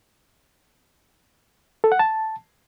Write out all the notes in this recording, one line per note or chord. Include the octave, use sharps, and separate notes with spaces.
A4
F#5
A5